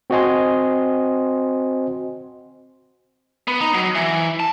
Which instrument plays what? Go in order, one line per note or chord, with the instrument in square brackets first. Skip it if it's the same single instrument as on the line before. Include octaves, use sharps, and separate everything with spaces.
[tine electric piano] C4 F#4 C5 D#5 G#5 C6
[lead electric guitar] B3
D#4
F#3
E3
A5